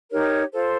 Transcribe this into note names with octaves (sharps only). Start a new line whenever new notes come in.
D#4 G4 A#4 C#5
F4 A4 C5